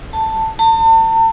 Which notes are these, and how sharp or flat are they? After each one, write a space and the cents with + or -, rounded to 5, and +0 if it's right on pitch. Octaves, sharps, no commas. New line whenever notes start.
A5 +10
A5 +40